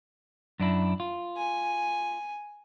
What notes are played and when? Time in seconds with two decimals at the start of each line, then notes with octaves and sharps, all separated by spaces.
0.60 F#2 D4 E4
1.00 F4
1.37 G#5